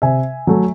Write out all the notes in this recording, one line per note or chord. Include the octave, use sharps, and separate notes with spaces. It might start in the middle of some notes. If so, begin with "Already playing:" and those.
C3 E5 G#5
F#3 A3